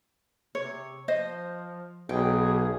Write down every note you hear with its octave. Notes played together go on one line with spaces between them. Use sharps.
C3 C#5
F3 C5 D#5
B1 G#4 G5